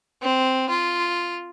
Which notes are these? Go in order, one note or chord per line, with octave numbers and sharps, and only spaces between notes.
C4
F4